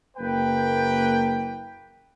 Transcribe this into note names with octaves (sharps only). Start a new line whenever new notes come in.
F#1 A#3 B4 G5